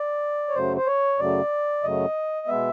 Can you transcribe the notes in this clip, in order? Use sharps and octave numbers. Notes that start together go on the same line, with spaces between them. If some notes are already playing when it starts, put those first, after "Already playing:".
Already playing: D5
C#5
F#2 C#3 F#3 A3 C5
C5
C#5
F#2 C#3 F#3 A3 D5
F#2 C#3 F#3 A3 D#5
B2 G#3 B3 E5